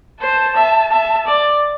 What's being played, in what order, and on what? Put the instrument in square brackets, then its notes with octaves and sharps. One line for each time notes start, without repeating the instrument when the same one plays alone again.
[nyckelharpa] C5 [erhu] A5
[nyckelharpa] E5
E5
D5